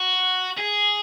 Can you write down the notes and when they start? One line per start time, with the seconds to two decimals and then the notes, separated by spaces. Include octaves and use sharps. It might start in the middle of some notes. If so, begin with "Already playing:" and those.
Already playing: F#4
0.57 G#4